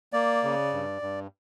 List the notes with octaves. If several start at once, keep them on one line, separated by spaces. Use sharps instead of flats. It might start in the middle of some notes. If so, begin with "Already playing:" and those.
A#3 D5
C#3
G2
G2